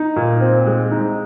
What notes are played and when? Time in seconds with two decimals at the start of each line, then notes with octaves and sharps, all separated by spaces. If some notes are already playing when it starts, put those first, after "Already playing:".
Already playing: D#4
0.16 A#2
0.41 C4
0.66 G#3
0.91 D#4